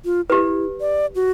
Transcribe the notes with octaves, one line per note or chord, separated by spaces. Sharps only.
F4
E4 G4 B4
D5
F#4